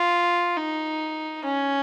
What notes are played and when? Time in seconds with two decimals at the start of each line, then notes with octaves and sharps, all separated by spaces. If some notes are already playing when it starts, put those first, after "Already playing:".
Already playing: F4
0.57 D#4
1.45 C#4